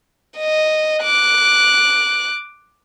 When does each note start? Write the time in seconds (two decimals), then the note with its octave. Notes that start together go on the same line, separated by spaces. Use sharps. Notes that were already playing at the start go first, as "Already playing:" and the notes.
0.38 D#5
1.03 D6 F#6